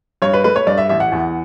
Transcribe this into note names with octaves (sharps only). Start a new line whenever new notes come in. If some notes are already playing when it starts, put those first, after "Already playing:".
G2 C#5
B4
A3 B4
C#5
G2 D5
E5
A1 E5
F#5
E2